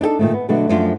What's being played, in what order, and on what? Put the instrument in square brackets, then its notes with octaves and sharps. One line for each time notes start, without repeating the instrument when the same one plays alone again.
[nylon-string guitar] D4 D#4 G4 A4
A#2 D#3 A3
B3
B2 D3 F#3 A3 B3 D4
F#2 F3 A3 D4 F4